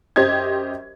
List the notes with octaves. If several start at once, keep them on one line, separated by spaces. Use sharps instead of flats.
F#2 G4 C5 D#5 G#6